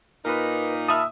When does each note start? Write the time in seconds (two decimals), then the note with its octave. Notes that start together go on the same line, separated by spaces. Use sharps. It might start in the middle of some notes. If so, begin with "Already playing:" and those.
0.25 A#2 D#4 A#4 B4
0.88 E5 A5 B5 D#6 F6